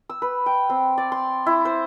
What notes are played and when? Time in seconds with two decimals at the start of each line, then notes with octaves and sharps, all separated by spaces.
0.10 E6
0.22 B4
0.46 G5
0.70 C4
0.98 D5
1.12 C6
1.46 E4
1.65 C5